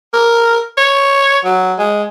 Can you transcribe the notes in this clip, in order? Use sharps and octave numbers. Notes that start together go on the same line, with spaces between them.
A#4
C#5
F#3
G#3